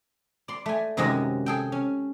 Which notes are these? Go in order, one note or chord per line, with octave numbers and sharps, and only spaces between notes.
D5 C6
A3 G#5
F#2 C3 D#3 G#3 F#4 D#5
G#4 A4 G5
C#4